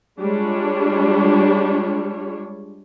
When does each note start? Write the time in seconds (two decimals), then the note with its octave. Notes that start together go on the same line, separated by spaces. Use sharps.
0.19 G3 G#3 D4 F4 C#5